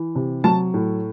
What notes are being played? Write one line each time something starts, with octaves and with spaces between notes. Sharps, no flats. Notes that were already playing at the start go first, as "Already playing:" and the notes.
Already playing: E3
C3
F#3 A5
A2